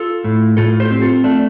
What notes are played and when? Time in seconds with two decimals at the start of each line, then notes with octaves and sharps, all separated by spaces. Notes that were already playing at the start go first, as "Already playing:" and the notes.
Already playing: F4 A4
0.24 A2
0.57 A2 F4 A4
0.80 G4 C5
0.91 C4
1.02 F4 A4
1.24 A3 D4